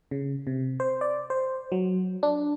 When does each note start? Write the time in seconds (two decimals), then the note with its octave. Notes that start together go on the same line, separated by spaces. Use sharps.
0.11 C#3
0.47 C3
0.80 C5
1.01 D5
1.30 C5
1.72 F#3
2.23 D4